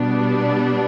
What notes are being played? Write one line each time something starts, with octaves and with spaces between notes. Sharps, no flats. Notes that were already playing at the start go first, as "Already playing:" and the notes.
Already playing: B2 G3 B3 D4